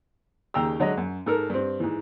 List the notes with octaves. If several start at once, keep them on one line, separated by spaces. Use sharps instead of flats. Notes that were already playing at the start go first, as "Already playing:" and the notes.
D#2 C#3 G5 A#5 E6
D3 F#3 G#3 D#5
F#2
G#2 A4 A#4
G2 C4
G#2 E3